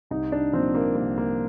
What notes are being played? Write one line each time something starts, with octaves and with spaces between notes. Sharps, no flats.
C2 D#4
D4
A#2 F3 C4
A#3
C2 A#3
A#3